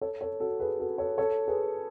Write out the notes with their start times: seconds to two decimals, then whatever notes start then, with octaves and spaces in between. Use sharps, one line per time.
0.01 A4 C#5
0.21 A4 C#5
0.40 F#4 A4
0.60 G#4 B4
0.79 F#4 A4
0.98 A4 C#5
1.18 A4 C#5
1.48 G#4 B4